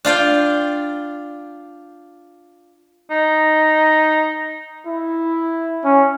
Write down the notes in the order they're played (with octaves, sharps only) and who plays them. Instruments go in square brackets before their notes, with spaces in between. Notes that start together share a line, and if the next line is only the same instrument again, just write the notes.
[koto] D4 F4 F5 G5
[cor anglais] D#4
[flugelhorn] E4
C#4